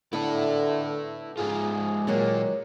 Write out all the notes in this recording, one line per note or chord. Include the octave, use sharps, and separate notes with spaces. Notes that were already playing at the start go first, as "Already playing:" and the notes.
D3 B3 E4 A4
G#2 F4 G#4
A#2 D#3 F#3 G#3